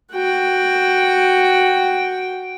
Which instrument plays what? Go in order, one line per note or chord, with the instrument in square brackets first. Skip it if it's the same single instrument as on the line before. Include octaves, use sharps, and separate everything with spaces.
[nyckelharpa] F#4 G5